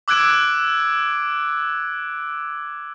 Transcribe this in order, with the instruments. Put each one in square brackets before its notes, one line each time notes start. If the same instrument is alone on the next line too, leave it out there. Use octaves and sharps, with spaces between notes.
[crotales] D6 E6 F#6 G#6 D7